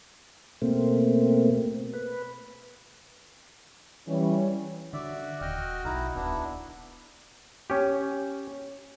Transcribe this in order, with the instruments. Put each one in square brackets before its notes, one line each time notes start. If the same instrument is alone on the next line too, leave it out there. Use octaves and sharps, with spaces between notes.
[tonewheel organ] B2 A3 A#3 C4
B4
[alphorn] E3 [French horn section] G3 C#4
[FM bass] D3 [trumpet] F#4 [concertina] D5 E5
[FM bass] D#1 [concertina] D#5 G5 F6
[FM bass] B1 [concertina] D#4 E4 A#5
[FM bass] D1 [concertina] B3 D4 E4
[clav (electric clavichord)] C#4 G4